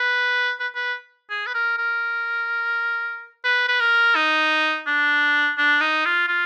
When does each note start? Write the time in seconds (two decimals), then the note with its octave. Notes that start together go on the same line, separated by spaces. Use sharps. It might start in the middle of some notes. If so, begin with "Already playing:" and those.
Already playing: B4
0.60 B4
0.75 B4
1.30 G#4
1.47 B4
1.54 A#4
1.78 A#4
3.44 B4
3.68 B4
3.80 A#4
4.16 D#4
4.87 D4
5.58 D4
5.81 D#4
6.05 F4
6.28 F4